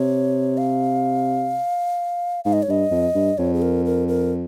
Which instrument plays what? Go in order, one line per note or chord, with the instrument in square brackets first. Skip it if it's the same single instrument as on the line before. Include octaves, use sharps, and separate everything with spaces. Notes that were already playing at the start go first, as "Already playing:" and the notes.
Already playing: [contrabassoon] C3 [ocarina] C#5
[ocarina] F5
[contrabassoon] G#2 [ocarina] F5
[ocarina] D#5
C#5
[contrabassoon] G2 [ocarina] D#5
[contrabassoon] F2
G2
[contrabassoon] F2 [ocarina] C#5
[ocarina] G#4
A#4
A#4
A#4